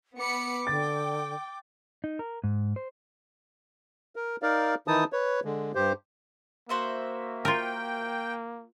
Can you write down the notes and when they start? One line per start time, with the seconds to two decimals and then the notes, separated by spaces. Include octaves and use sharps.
0.20 B3 B5 D6 C#7
0.67 D3 G5 A6
2.04 D#4
2.19 A#4
2.44 G#2
2.76 C5
4.16 A#4
4.42 D#4 A#4 D5 F5
4.88 D#3 E3 D#4 E4 A5 D#6
5.13 B4 C#5
5.45 D3 G#3
5.75 G2 G4 C5
6.69 A#3 F#4 C5 E5
7.45 F4 A#4 G5